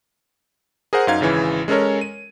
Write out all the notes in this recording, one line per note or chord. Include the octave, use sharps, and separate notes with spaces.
G#4 A#4 C5 F#5
F#2 D#4 F5 G#6
G#1 C#3 E3
G#3 C#4 A4 A#4 C#5
D#7